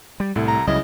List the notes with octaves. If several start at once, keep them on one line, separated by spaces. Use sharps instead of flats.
G3
C2 A2 E4 A4
A#5
C#2 C#3 F#3 G3 E4 D#5